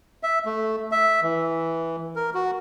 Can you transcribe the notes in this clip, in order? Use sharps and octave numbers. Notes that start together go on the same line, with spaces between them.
E5
A3
E5
E3
A#4
F#4